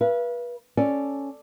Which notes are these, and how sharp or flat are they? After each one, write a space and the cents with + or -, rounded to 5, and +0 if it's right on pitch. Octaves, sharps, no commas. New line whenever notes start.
B4 -30 F5 -45
C#4 +0 A4 +0 D5 +0